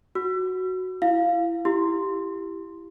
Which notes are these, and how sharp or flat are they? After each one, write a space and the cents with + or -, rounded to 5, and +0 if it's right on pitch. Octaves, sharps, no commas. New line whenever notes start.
F#4 +0 E6 +40
E4 +25 F5 +0
E4 +15 G4 +0 C6 +0